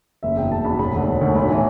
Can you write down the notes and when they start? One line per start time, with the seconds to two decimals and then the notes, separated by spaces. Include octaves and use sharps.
0.23 F#1 E5
0.36 E2 B2 G5
0.51 F#1 A5
0.65 E2 B2 B5
0.79 E1 B5
0.93 D2 D3
1.08 E1
1.21 D2 D3
1.35 B1 B5
1.49 A2 E3